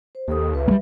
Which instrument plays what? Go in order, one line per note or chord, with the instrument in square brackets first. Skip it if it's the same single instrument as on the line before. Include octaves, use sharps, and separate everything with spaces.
[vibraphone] C5
[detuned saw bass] D#2 [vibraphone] G4 A4 D#6
[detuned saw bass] C#2 [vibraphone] B4 E5
[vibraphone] F#3 [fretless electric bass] G3 A#3